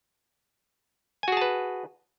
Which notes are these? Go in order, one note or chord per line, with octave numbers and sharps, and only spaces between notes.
F#4 G#4 B4 G#5 A5